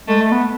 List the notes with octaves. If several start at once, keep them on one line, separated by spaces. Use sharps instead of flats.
G#3 A3
A3
B3